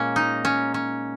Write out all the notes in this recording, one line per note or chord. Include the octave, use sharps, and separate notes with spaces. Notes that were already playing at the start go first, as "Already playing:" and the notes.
Already playing: A#2 G#3 A#3 C#4
D#4
C#4
C#4